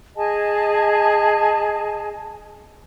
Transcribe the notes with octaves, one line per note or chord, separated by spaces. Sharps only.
G#4 D#5 G#5 A5